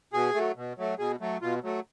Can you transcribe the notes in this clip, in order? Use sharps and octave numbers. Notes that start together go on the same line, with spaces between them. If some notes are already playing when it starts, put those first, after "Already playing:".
B2 G#4
F#3 A3
B2
F#3 A3
B2 G#4
F#3 A3
B2 F4
F#3 A3